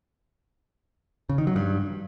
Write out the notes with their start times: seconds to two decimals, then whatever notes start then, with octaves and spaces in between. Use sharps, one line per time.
1.29 C#3
1.38 D#3
1.47 F#3
1.56 G2